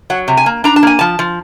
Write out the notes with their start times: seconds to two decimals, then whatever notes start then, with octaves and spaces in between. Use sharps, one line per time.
0.10 F#3 F#5
0.28 C3
0.37 G#5
0.46 A#3
0.64 D4 A#5
0.76 A5
0.83 A#3 G#5
0.99 F3 A5
1.19 F3